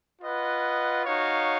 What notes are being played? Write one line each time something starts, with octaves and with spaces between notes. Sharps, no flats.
F4 B4 D#5 F#5
D#4 F#4 C#5 F5